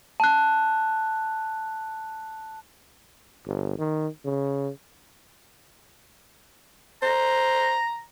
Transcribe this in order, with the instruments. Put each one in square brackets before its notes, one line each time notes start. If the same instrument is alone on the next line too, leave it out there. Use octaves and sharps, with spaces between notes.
[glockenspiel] A5 F#6
[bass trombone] G1
D#3
C#3
[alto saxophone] C5 [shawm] A#5